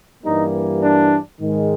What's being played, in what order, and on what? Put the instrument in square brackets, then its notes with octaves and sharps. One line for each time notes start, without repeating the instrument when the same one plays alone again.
[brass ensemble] G2 E3 G3 A#3 D#4
D4
G#2 D#3 G#3